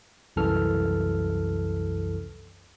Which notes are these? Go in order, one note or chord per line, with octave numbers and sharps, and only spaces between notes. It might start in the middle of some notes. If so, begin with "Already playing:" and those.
C2 F#2 E3 A4 F6